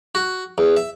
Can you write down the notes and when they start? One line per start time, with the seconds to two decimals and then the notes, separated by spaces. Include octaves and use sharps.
0.15 F#4
0.58 E2
0.77 E5